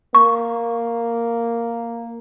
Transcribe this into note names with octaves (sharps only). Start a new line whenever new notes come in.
A#3 C#6